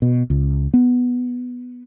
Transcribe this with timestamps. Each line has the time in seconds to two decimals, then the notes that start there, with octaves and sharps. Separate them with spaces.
0.02 B2
0.30 C#2
0.74 B3